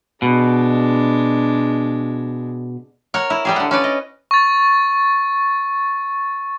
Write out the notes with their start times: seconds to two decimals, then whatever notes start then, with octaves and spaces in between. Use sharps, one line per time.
0.22 B2 G#3 D4
3.14 A#4 C#5 F#5
3.30 E4
3.45 G3 G4 G#4
3.56 D3 F#5
3.71 C#4 B4 D5
3.84 D#5
4.31 C#6 A6